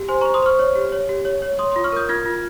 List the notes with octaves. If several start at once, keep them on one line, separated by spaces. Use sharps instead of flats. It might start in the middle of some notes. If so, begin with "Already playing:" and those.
Already playing: G4
C5 G#5 C6
A#5 C#6
C5
C6 D#6
C5 C#6 F6
C#5
G4
C#5
G4
C#5
C#5
C#5 C6 D#6
C6 D#6
F4
C#6 F6
A#4 D#6 G6
F4 F6 G#6
F4